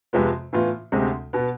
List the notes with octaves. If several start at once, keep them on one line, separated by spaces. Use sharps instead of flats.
F2 C3 F3 G#3 B3
A2 E3 B3 F4
D2 C3 G#3 C4
B2 B3